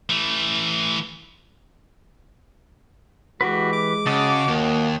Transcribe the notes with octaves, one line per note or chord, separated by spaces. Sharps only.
E3 A3
E3 G#3 F#4 G4 B4
D6
C#3 F#4 D#5 A5
D#2 A#3